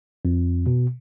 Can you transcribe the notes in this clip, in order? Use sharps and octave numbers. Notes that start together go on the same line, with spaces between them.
F2
B2